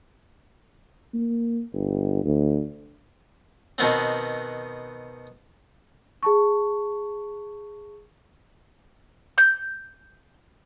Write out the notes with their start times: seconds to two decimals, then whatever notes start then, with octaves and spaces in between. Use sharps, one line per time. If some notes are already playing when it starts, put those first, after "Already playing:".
1.14 A#3
1.73 G1
2.24 D2
3.78 B2 D#3 B3 C4
6.23 G#4 A5 C#6
9.38 G6